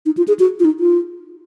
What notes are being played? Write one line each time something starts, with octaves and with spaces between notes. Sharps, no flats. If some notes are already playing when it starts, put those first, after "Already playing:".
D#4
F4
G#4
F#4
F4
D#4
F4